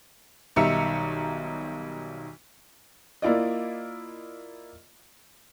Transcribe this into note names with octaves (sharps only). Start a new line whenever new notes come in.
B1 D#3 G3 E5 A#5 C#7
A#3 E4 F4 D5 D#5